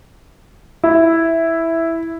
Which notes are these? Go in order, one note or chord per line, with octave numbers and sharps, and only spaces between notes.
E4